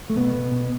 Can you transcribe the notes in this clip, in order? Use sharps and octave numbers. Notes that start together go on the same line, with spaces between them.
A3
B2 B3
B2
B2